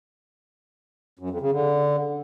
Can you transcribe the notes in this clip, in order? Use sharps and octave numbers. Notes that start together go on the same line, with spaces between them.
F#2
F2
C#3
D3